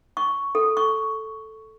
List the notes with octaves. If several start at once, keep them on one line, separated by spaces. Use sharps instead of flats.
C#6
A4
C#6